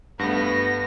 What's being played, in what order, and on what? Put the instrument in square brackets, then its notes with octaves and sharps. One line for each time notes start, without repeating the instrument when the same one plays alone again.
[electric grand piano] G2 A3 [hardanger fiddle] B3 [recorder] A#6